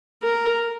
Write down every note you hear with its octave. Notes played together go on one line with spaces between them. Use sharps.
A#4